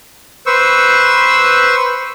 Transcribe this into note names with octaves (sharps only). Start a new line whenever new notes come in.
B4 C5 C#6 E6